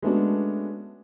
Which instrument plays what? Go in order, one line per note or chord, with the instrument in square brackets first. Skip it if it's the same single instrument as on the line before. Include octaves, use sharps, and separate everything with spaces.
[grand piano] G#3 A3 B3 C#4 D4 F#4